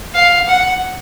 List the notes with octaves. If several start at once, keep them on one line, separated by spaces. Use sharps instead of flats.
F5
F#5